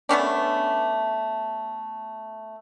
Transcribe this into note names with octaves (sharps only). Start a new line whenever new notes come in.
A3 B3 C#4 D4